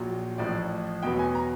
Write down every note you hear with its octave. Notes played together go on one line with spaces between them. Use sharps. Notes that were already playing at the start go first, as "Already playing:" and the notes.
Already playing: A#1 A#2 F#3
A1 A2 F3 D5
E2 B2 F#3 B3 G5
G#5
A#5